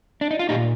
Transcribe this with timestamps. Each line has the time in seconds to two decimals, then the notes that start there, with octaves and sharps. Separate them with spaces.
0.21 D4
0.31 D#4
0.39 F4
0.49 A#2 D#4 G4